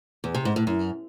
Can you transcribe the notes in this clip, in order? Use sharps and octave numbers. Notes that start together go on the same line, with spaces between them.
E2
C3
G#2
A2
F#2